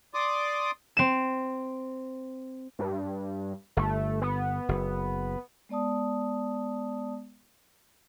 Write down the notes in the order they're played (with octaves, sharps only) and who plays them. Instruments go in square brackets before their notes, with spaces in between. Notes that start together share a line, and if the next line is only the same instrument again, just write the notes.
[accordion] D5 C6 D6 D#6
[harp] C4 E7
[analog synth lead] G2
[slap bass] G1 [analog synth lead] A3
[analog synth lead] B3
[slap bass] F#1
[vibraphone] G#3 B3 D5 A5 D#6